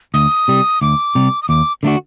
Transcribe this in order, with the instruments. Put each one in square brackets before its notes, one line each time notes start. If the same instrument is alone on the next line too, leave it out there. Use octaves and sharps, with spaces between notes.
[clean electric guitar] D2 [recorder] D#6
[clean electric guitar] C3 G3
[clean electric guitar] D2 [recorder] D6
[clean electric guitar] C3 G3
[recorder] D#6
[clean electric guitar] D#2 [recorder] D6
[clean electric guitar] D3 A3 D4 F#4